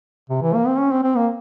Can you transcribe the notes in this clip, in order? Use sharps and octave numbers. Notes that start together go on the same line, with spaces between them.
C3
E3
A#3
C4
C#4
C4
C4
A#3